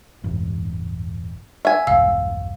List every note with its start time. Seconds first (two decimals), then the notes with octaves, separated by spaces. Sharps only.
0.24 E1 A1 G2
1.65 E5 G#5
1.87 E1 B1 G2 F5 E6